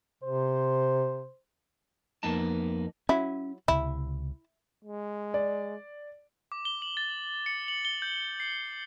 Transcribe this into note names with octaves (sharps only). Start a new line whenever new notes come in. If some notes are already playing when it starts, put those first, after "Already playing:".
C3 C5
F2 A#3 B3 D#4 A5
F#3 C#4 E4
C#2 C3 E4
G#3
D5
D6
G7
F#7
A6
C#7
F#7
G7
G6
C7